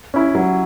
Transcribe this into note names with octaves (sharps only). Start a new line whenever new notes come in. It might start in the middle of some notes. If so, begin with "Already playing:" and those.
C#4 E4
F#3